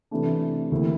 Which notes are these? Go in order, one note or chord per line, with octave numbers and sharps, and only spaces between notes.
C3 E3 A3 D4
D2 C3 E3 A#3 E4